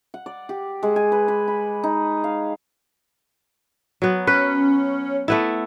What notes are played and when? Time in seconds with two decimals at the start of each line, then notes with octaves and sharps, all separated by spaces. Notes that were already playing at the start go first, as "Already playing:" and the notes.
0.14 F#5
0.26 D5
0.49 G4
0.83 G#3
0.96 G#5
1.12 B4
1.28 B4
1.48 B5
1.84 D#4
2.24 F5
4.02 F#3 B3
4.27 C#4 B4
5.28 A3 B3 E4